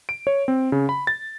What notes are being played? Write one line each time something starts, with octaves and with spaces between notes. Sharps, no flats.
D7
C#5
C4
C#3
B5
A6